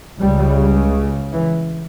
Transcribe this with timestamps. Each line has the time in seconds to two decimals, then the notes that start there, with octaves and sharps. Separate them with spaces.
0.20 C#2 C#3 G3
1.32 E3